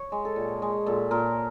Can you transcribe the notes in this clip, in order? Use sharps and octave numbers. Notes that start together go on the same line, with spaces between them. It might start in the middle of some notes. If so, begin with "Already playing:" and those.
Already playing: C#5
G#3
A4
A#2
G#3 G#4
A#2 A4
A#2 A#4